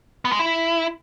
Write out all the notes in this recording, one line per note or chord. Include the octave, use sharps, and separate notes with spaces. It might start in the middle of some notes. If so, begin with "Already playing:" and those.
B3
G#3
E4